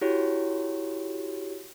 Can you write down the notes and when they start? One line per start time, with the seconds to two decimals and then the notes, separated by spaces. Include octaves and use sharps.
0.01 E4 F#4 G4 C#5